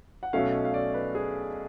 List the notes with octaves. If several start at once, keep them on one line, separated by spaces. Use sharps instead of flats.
F#5
B1 B2 A3 C#4 F5
F5
D5
B4
G#4